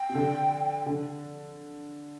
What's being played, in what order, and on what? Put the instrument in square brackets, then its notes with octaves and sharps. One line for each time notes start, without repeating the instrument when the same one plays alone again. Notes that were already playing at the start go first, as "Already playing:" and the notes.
Already playing: [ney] G5
[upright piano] C3
D3
D3